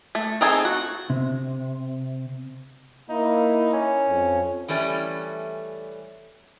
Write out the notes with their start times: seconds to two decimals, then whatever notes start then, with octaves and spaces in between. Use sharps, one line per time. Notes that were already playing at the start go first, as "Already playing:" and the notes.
0.15 A3
0.41 C4 D#4 G#4 A4
0.65 F#4
1.10 C3
3.10 A#3 D#4 E4
3.74 C#4
4.08 F2
4.69 E3 G3 A3 C#4